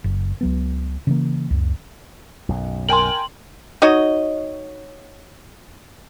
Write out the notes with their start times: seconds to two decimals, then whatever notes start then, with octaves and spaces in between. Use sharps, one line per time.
0.04 F#1
0.41 C#2 F#3 B3
1.07 C#3 E3 A#3
1.50 C#2 F#2
2.49 B1 F#2 B2
2.89 A#4 G5 G#5 C6 F#7
3.82 D#4 F#4 C#5 D#5